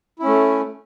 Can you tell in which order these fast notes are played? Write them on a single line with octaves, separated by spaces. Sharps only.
E4 C#4 A3